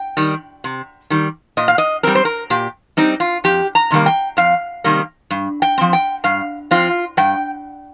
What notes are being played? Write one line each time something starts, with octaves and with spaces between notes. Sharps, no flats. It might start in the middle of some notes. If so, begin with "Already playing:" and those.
Already playing: G5
D#3 G3
C3
D#3 G3
A#2 D#5
F5
D#5
G3 C4 A#4
C5
A#4
A#2 G4
G3 C4 D#4
F4
F2 G4
A#5
C3 D#3 G3 A#3
G5
F2 F5
C3 D#3 G3 A#3
G2
G5
F3 C4
G5
G2 F5
F3 C4 F4
G2 G5